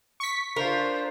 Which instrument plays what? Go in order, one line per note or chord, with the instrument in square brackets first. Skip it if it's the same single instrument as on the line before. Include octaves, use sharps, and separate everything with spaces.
[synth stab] C#6 B6
[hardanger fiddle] D4 F4 [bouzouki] A#4 [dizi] C5